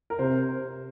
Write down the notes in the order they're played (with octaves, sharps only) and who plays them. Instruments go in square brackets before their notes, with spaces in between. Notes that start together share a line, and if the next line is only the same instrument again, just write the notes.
[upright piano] A#4
[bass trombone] C3 [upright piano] C5